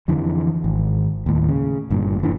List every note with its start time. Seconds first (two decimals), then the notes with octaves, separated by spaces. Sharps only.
0.08 F2 D3 E3
0.64 G#1
1.26 D#2 A2
1.49 C#3
1.90 G1 G2 A#2
2.23 F1 E3 D4